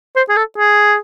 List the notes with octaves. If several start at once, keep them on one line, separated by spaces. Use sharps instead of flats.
C5
G#4
A4
G#4